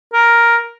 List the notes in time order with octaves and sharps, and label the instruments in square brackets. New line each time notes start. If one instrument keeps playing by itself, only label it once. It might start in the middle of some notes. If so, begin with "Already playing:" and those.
[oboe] A#4